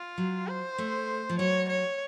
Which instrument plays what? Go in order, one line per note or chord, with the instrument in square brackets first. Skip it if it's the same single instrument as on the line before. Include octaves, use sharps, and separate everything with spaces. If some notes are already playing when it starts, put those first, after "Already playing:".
Already playing: [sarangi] F4
[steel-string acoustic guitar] F#3
[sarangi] C5
[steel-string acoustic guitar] A3
F3
[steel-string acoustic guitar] F#3 [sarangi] C#5
[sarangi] C#5